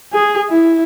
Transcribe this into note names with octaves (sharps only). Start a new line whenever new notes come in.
G#4
E4